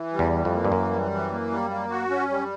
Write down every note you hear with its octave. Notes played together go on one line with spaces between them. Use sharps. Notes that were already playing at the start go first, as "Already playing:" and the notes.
Already playing: E3
G3
E2
E3
F2
A#3
G2
F#2 E3
G3
E3
A#3
G3
A#3
F#4
C#4
G3